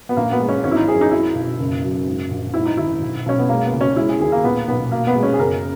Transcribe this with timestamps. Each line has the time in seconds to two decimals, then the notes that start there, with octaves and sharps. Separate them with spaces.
0.09 B3
0.17 A#1 A#3
0.32 B3
0.40 G#3
0.49 C#4
0.64 G#1 C#4
0.71 E4
0.76 D#4
0.88 F#2 G#4
1.01 D#4
1.11 F#3 E4
1.35 B1
1.60 F#1
1.83 F#2
2.07 G#2
2.31 A#1
2.54 G#2 E4
2.65 D#4
2.77 D#3 E4
3.01 B1
3.26 B1 C#4
3.39 B3
3.49 G#3 A#3
3.65 B3
3.73 C#2
3.81 C#4
3.96 G#3 E4
4.09 G#4
4.20 D#2 G#4
4.32 A#3
4.44 A#2 B3
4.68 B1 B3
4.92 B2 A#3
5.07 B3
5.15 G#3
5.23 C#4
5.33 G#4
5.39 F#1 A#4